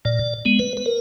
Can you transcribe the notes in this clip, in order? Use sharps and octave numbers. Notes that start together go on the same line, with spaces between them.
A#2 D5
G#3 B3
B4
B4
A#4